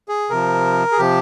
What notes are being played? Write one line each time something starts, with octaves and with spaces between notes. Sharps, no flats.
G#4
C3 F3 A#4
G#4
C3 F3 G4